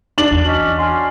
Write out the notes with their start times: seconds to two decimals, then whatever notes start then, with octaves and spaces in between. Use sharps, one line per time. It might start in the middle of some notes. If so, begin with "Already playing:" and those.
0.18 D4 F#7
0.31 E2
0.45 C#4 F#4 D#5 B6
0.78 F#5 G#5 C6 F6